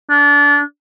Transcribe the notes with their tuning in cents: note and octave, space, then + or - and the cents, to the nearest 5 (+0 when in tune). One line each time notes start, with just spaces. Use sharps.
D4 -30